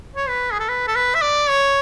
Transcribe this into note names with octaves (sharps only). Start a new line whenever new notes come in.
C#5
B4
G#4
A4
B4
A4
B4
E5
D5
C#5